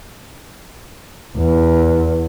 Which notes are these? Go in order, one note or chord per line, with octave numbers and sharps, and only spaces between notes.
E2